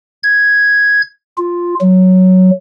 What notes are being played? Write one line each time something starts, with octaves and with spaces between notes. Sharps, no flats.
G#6
F4
F#3